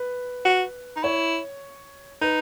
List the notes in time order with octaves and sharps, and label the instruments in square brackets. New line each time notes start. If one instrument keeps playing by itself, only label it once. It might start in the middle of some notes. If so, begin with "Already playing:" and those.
Already playing: [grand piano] B4
[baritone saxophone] F#4
D#4
[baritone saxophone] E4 [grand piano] C#5
[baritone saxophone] D#4 [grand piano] B4